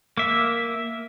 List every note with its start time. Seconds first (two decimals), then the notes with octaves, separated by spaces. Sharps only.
0.17 A#3 E5